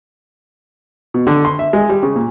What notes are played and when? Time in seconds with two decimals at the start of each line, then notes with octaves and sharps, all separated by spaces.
1.14 B2
1.27 D3
1.45 C6
1.59 E5
1.73 G#3
1.89 G3
2.03 C#3
2.16 A#2